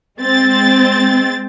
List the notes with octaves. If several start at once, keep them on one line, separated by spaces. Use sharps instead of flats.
G#3 C4 A6